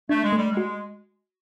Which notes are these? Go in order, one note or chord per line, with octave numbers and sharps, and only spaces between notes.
A3 D4
G#3
G3 A3
G#3
F#4